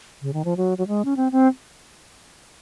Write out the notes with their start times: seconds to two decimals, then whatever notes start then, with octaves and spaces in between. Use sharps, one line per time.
0.22 C#3
0.33 D#3
0.45 F3
0.57 F#3
0.78 F#3
0.87 G#3
1.05 C#4
1.17 C4
1.32 C4